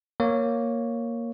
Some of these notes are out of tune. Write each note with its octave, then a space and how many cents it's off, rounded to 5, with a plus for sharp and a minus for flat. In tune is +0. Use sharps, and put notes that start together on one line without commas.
A#3 +0 C#5 +0